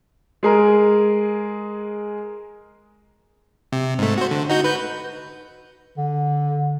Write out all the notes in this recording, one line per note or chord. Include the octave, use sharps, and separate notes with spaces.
G#3 G#4 A#4
C3
G#2 A3
F#4 C5
D3
D#4 F#4 G6
B4 G6
D3